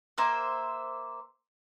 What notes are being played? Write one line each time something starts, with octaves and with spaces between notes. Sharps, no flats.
A#3 C5 E5